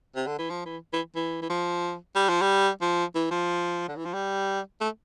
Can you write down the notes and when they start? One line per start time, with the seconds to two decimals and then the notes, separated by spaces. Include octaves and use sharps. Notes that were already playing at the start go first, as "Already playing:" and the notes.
0.16 C3
0.27 D3
0.39 E3
0.50 F3
0.66 E3
0.93 E3
1.16 E3
1.42 E3
1.50 F3
2.16 G3
2.29 F3
2.42 G3
2.81 F3
3.15 E3
3.31 F3
3.88 D3
3.97 E3
4.06 F3
4.14 G3
4.81 A3